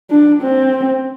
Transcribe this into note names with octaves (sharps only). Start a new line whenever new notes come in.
D4
C4